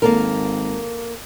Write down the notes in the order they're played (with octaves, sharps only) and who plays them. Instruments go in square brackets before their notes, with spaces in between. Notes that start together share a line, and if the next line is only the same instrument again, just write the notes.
[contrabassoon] G#1 [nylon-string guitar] A#3 A4 A#4